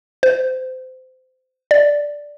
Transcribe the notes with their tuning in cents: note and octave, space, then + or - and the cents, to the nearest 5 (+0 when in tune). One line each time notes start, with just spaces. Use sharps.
C5 -25
D5 -5